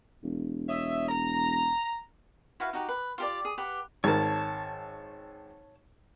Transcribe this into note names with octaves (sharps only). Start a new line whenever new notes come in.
E1
C#5 D#5 E5
A#5
E4 F#4 B4 F5
D#4 F#4 G4
B4
F4 G4 D5
G#4
G4 B4 F#5 D6
G#1 A#4 C#5 A5